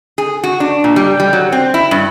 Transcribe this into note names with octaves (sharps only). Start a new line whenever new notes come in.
G#4
F#4
D4
A#2
G3
G3
F#3
C4
E4
G2